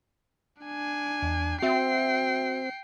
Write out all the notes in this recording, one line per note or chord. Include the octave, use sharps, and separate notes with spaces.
D4 G#5
E2
C4 F#4 E5 G5 C7